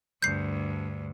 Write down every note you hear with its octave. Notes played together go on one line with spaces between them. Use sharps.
D2 G2 G6 C7